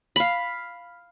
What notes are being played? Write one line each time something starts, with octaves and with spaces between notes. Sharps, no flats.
F5 B5